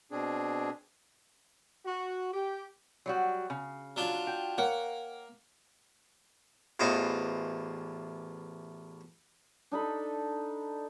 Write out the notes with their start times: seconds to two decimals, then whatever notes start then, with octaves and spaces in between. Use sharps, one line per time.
0.11 B2 C4 D4 G#4
1.85 F#4
2.31 G4
3.06 F#3 G3 F#4
3.50 C#3
3.96 F#3 D4 F4
4.27 G5
4.58 A#3 C#5 F#5
6.80 A1 E2 F4 C5 D#5 C#6
9.72 D4 D#4 A4 B5